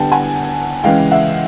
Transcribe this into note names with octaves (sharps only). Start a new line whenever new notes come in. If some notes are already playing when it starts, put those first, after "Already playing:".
Already playing: D3 G3 B3 G5 A5
F#5 G#5
C#3 E3 G#3 F5 G5
E5 F#5